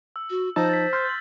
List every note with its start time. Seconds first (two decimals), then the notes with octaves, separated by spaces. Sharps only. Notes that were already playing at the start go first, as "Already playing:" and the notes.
0.16 E6
0.30 F#4
0.56 F3 D#4 C5 A5 E6 A#6
0.69 A6 B6
0.93 C6 F6 G6 A6
1.05 A6 F#7